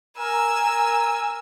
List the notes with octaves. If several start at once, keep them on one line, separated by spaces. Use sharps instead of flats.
A#4 G#5 E6